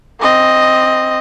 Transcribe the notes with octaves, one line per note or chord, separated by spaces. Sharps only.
C4 D#5